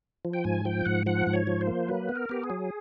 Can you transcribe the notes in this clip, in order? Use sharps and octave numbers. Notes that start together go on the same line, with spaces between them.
F3
G5
G#2 G#5
F3 G5
G#2 F#5
F3 F#5
G#2
C#5
F3
C5
A#3
F#3 B4
B3
A#4
B3 G4
G#4
F#3